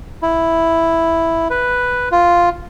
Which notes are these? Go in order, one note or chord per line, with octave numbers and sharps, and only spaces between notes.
E4
B4
F4